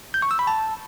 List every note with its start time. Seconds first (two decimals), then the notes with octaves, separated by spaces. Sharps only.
0.14 G6
0.22 C#6
0.31 E6
0.39 B5
0.47 A5